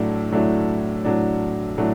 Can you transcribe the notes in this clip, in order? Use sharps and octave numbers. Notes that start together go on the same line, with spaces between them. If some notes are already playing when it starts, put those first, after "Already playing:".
Already playing: A2 F#3 A3 D4
A2 F#3 A3 D4
A2 F#3 A3 D4
A2 F#3 A3 D4